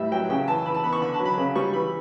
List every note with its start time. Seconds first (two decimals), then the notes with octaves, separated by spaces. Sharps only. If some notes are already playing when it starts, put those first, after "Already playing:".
Already playing: A2 G3 E5
0.12 F#3 G5
0.30 C#3 G5
0.47 E3 A5
0.66 E3 B5
0.75 A5
0.83 B3 B5
0.93 C#6
1.02 D3 B5
1.14 A5
1.20 F#3
1.25 B5
1.38 C#3
1.56 G3 C#6
1.73 E3 B5